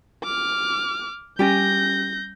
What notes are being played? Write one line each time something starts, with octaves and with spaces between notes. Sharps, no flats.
D6 F6
G3 C#4 G4 G5 G#5 G6 A#6